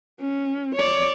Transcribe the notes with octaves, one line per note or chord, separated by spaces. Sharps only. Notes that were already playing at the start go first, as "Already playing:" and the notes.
C#4
C#5 D5